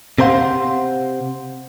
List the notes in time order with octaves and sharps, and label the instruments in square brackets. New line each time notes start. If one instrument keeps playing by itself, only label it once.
[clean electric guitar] C3 C4 A#4 C5 F5 F#5